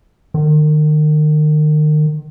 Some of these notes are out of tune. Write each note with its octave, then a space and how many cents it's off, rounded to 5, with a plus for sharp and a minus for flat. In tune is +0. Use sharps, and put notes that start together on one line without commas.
D#3 -35